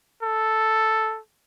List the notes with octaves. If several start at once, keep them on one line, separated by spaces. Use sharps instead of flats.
A4